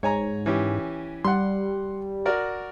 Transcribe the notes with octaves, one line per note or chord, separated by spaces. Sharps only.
G#2 C#5 G#5 A#5
E3 C#4 G4
G3 F#5 C6
F#4 A#4 D5